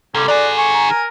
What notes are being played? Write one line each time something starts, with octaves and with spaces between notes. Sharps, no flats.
C2 C#4 A4 C6 D6
D#3 F#4 G#4 D5
G#5 C#6
A#5
A#4